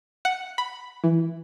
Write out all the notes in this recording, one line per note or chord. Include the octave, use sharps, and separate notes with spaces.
F#5
B5
E3